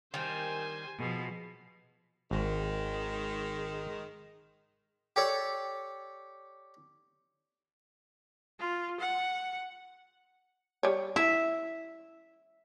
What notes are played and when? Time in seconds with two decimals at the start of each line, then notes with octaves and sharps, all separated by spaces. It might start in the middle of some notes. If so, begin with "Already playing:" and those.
0.14 D#3 G3 C4 C5 G#5
0.99 B2 F3 G#4
2.31 G#1 D#3 G#3
5.16 G4 A4 C#5 D5
8.59 F4
9.00 F#5
10.83 G3 C#5
11.16 E4 E5